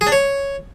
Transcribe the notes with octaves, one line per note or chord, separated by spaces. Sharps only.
G#4
D4
C#5